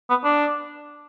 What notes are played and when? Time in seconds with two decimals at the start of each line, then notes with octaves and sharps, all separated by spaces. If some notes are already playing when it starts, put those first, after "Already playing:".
0.10 B3
0.24 D4